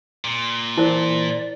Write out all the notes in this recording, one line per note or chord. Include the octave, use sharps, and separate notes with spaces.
A#2
E3 E4 A#4 C5 D5